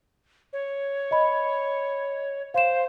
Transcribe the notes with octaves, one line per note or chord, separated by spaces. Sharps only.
C#5
D#5 B5
C5 F5 E7